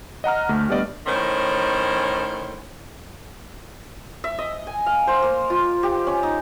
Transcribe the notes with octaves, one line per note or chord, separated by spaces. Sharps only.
D#5 F#5 A#5 F6
D2 A3
G3 A3 B3 D4 D5 D#5
A2 D#3 C#4 C5
E5
D#5
G#5
F5
C5
A#3
F4
G4
C#4
D#4